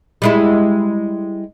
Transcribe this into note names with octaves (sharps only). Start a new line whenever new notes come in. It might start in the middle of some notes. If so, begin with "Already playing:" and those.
G3 G#3 E4